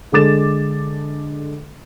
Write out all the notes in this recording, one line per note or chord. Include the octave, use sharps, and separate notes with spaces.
D3 G#3 A4 D6 A6 E7